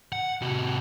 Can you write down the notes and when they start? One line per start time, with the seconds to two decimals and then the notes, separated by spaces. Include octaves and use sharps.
0.12 F#5
0.42 C3 F#4